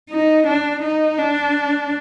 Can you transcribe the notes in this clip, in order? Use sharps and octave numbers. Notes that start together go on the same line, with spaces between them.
D#4
D4
D#4
D4